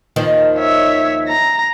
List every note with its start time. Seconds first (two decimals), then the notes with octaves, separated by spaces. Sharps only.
0.16 D#2 D#3 F3
0.57 C#5 E5
1.29 A#5